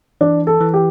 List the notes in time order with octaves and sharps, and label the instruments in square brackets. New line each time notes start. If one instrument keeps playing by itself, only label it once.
[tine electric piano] E3 [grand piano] D4
[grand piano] A4
[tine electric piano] E3
[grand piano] G4